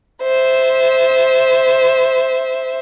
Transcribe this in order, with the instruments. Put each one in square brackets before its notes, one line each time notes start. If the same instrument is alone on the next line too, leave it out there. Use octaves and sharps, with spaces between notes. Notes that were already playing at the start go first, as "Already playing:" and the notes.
[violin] C5 E5